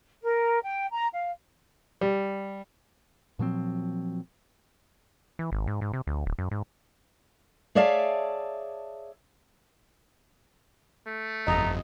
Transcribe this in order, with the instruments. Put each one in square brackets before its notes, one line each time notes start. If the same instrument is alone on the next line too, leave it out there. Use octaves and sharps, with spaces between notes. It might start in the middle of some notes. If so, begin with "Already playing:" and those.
[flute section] A#4
G5
A#5
F5
[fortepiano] G3
[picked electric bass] A#2 F3 F#3 C4
[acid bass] E3
G#1
G#2
G#2
C3
D2
D1
F#2
G#2
[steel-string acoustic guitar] G#4 C#5 D5 E5 F5 A5
[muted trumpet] A3
[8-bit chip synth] G1 F2 [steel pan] D#5 [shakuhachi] A#5